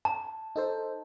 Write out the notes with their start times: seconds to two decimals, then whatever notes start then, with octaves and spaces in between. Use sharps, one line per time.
0.05 A5
0.56 D#4 A4 C5